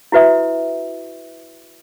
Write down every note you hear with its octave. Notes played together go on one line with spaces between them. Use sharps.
E4 F#4 B4 E5 D#6